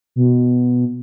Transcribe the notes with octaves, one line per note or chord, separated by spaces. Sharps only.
B2